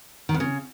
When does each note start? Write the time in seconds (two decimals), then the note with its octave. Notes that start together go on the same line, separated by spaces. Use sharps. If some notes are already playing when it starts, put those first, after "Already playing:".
0.29 D#3
0.34 F2
0.40 C#3